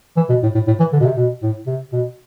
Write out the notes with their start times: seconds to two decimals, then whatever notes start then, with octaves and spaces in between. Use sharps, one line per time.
0.17 E3
0.30 B2
0.43 A2
0.55 A2
0.67 A2
0.80 E3
0.93 D3
1.00 B2
1.05 C3
1.17 B2
1.43 A2
1.67 C3
1.93 B2